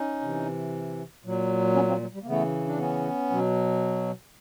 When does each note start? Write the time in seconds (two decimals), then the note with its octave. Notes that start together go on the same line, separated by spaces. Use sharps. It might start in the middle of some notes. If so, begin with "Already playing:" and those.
Already playing: C#4 D#4
0.21 C3 E3
1.24 A#2 F#3
1.75 B3 C#4
1.88 A#3 C4
2.01 F#3
2.14 G3
2.22 A#3
2.26 C#3 E3 A3 B3
2.67 D4
2.78 B3 C#4
3.30 B2 F#3